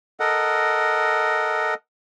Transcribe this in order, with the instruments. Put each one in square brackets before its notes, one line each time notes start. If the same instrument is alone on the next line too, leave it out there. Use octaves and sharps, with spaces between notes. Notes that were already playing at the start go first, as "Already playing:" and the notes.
[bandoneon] A4 A#4 D#5 F#5